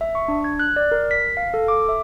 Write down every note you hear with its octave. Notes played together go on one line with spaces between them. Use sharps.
E5
C#6
D4
G#6
F#6
D5
A#4
B6
F5
A4
D6
E5